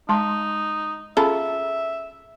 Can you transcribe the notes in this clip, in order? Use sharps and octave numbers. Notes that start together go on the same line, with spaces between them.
G#3 D#4 A5 C6
C#4 F4 G#4 A4 E5 A#5 B5